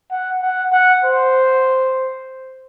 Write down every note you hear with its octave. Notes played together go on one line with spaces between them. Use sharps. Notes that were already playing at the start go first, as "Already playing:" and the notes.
F#5
F#5
F#5
C5